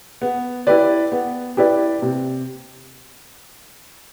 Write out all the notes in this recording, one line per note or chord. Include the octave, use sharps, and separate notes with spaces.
B3
E4 G4 B4 D5
B3
E4 G4 B4 D5
C3